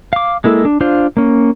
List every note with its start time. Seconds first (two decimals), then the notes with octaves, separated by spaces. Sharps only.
0.13 F5 D6
0.44 G#3 A#3 E4 A4
0.65 D4
0.81 D4 F4 C5 F5
1.17 A#3 C#4